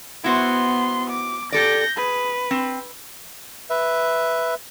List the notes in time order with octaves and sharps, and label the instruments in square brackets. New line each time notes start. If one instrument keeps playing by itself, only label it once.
[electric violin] B3 C6 [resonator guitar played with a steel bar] E4 F#4 C5
[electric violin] D6
[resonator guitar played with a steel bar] G4 A4 D5 [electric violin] G6 A#6
[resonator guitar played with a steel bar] G#4 [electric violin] B4
[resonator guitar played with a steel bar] C4
[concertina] B4 E5